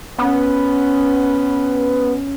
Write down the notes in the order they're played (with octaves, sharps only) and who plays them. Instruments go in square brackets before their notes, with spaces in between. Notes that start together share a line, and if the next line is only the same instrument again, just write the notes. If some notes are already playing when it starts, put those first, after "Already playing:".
[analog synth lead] B3 [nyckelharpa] C#4